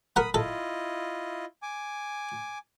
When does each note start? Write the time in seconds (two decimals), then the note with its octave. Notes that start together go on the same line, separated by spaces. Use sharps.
0.16 A#4 F#5 B5 D#6
0.34 E4 F4 A4 D#5
1.62 G#5 D6